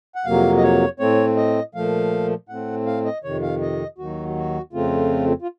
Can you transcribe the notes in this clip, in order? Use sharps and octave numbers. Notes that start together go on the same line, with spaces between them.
F#5
F2 C3 F#3 A#3 F5
D#5
C#5
A2 A3 C4 C#5
D#5
A#2 F3 A3 F5
A2 A3 C4 F#5
F5
D#5
F2 C3 D#3 C#5
F5
D#5
D#2 D#3 F#3 F#4
F#4
F2 C#3 A3 C4 F4
F4